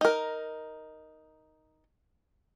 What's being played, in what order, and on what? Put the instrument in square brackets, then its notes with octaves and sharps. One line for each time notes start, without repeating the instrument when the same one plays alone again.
[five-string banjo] D#4 A#4